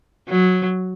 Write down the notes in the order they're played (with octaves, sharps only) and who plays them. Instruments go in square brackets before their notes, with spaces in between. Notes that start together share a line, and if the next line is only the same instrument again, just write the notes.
[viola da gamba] F#3